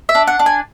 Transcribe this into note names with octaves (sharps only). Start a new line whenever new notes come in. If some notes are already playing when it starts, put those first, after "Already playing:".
E5
D4
F#5
D4
G#5